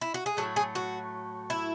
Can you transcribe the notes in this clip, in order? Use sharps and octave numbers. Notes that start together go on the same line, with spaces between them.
E4
F#4
G#4
A2 F#3 A3 A4
G#4
F#4
E4